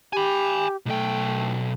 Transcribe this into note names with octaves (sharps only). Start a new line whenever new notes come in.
G4 G#5 B5
B1 A3 G5